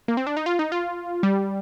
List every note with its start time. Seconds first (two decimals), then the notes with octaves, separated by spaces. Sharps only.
0.08 A#3
0.17 C4
0.27 D4
0.37 D#4
0.46 F4
0.59 D#4
0.72 F4
1.23 G3